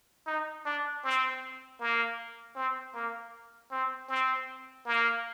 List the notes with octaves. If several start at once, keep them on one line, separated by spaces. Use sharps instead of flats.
D#4
D4
C4
A#3
C4
A#3
C4
C4
A#3